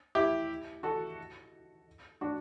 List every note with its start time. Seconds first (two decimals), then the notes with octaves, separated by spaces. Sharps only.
0.15 E4 G4
0.83 F#4 A4
2.21 D4 F#4